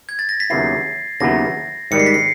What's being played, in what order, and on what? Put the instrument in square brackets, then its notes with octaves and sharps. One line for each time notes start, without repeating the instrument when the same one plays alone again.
[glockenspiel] G#6
A6
A#6
B6
[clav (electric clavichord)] D#2 C#3 F#3 B3 E4 [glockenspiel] C7
[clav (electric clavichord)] D#2 C#3 F#3 B3 E4 [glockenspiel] A#6
[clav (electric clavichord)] G#2 D#3 G3 [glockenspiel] C#7
[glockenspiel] C7
B6
C7